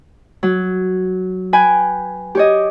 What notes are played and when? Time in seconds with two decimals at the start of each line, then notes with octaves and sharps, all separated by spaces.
0.43 F#3
1.53 B4 G5 G#5
2.35 G4 C#5 D#5